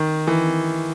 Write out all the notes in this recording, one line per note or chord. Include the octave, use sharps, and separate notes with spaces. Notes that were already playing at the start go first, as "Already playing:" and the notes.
Already playing: D#3
E3